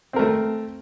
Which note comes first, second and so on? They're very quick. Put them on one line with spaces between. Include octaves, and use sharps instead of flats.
C4 A#4 A3